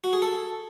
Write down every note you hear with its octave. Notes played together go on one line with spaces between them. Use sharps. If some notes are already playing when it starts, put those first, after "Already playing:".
F#4
G#4
A4